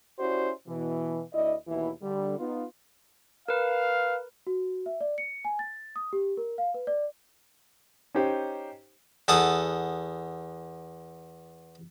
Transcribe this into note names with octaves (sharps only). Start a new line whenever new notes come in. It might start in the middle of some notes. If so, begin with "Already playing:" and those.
C#4 E4 F#4 G4 C5 D5
B2 E3
D2 E4 D5 D#5
D#2 B2 E3 E4
D3 G3
B3 D#4 F4
A#4 B4 F5
F#4
E5
D5
C#7
G#5
A6
D#6
G4
A#4
F5
B4
D5
C#4 D#4 G4 C5
E2 A4 F#5 D#6